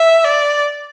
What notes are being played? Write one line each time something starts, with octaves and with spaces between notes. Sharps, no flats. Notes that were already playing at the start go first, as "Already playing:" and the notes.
Already playing: E5
D5